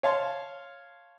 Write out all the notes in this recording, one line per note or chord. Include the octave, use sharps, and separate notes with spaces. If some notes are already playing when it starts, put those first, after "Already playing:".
C#5 F5 A5 C6